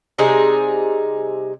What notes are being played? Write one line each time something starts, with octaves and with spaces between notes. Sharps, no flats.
C3 G3 D#4 G#4